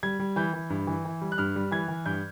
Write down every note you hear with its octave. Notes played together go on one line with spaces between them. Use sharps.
G3 G#6
G3
E3 G6
E3
G2
E3
E3
G3
F#6
G2 F6
G3
E3 G#6
E3
G2 G6